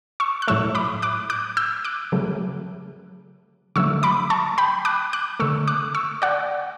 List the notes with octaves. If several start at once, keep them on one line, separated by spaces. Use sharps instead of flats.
C#6 E6
F#6
A2 F#3 A3 C#6 E6
B5 D6
D6 F#6
D6 F#6
E6 G6
D6 F#6
C#3 F#3 A3
D3 F#3 A3 C#6 E6
B5 D6
A5 C#6
G5 B5
D6 F#6
D6 F#6
D3 A3 C#6 E6
D6 F#6
C#6 E6
D5 F#5